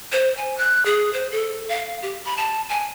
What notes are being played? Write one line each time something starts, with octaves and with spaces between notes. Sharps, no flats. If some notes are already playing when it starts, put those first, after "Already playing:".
C5
G#5
F#6
G#4
C5
A4
F5
G4
B5
A5
G#5